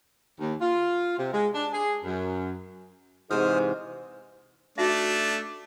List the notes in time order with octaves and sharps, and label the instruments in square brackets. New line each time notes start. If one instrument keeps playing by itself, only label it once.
[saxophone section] D#2
F4
C3
G#3
D4
G#4
F#2
[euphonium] G#2 [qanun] C3 F#4 [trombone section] E3 G#4 [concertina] C5 D#6 F6
[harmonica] A3 D4 [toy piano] D#4 F#4 E5